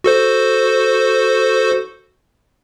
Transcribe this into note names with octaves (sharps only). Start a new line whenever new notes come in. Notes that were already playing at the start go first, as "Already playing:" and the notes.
F#4 A4 C5